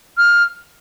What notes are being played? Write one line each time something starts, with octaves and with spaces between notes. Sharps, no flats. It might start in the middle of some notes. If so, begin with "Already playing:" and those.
F6